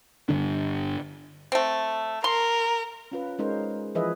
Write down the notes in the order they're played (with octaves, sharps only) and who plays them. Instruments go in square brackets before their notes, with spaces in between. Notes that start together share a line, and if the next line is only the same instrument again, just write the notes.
[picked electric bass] G1 G2 D3 D4
[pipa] A3 C4
[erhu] A#4 [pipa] C6
[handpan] C#4 F4 B4
G#3 C#4 D#4 A#4 C5
E3 F3 G#4 B4 D#5 E5